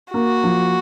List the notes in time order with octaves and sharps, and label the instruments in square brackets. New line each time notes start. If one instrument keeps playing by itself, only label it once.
[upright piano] A#3 [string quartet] F#4
[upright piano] F3